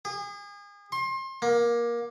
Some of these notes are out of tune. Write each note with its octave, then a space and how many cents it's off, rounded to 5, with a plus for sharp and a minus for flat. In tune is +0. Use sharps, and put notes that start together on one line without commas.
G#4 -35
C6 +30
A#3 +20